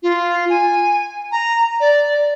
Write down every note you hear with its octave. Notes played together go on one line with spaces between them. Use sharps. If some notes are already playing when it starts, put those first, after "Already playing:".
F4
G#5
A#5
D5